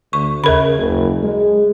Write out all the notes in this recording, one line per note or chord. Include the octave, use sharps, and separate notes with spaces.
D2 C#6
D#2 C#3 A#4 B5
F#1
G#3